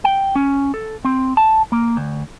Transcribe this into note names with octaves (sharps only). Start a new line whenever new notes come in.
G5
C#4
A4
C4
A5
A#3
D2